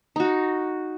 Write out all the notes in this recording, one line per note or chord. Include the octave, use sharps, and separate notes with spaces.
D#4 F#4